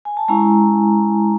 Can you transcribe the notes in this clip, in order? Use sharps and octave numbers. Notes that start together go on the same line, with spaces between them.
G#5
A5
G#3 C#4 E4 G#5 A#5